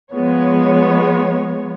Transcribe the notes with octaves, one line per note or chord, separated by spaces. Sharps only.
F3 G#3 B3 C#5